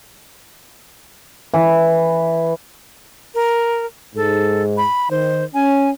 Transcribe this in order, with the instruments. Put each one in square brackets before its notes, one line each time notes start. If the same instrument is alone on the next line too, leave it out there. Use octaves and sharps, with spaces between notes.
[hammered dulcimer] E3
[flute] A#4
[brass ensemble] G#2 [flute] A4
[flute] B5
[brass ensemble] D#3 [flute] C5
[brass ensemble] C#4 [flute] G#5